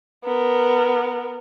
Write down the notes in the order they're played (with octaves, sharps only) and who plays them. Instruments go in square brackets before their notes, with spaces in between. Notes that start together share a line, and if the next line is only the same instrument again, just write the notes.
[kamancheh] B3 A#4